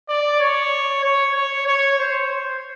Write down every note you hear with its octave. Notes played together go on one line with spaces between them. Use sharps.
D5
C#5
C#5
C#5
C#5
C5
C5